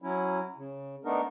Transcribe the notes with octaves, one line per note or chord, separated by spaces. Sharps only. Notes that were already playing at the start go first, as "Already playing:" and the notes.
F#3 C#4 E4
C#3
A3 B3 D4 D#4 A#4